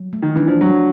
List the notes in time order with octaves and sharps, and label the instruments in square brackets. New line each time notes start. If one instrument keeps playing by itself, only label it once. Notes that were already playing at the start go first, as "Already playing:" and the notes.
Already playing: [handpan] F#3
A3
[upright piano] D#3
[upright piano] E3 [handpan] D4
[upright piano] F3
[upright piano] F#3 [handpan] D4